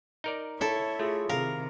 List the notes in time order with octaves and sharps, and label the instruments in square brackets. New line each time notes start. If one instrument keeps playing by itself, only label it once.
[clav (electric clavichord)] D#4 A#4 D5
[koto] E4 A4 [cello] C#5 E5
[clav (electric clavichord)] A3 [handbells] F4 G#4
[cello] C3 D#3 [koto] A#4 [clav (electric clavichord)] F5